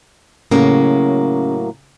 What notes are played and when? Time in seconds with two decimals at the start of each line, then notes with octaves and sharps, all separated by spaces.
0.51 A2 C#3 F#3 A#3